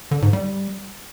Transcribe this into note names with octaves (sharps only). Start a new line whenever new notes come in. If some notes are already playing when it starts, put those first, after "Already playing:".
D3
G#2
G3